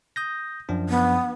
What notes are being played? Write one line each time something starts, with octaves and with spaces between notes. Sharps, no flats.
D#6 G6 A#6
F#2 F3 D4
B3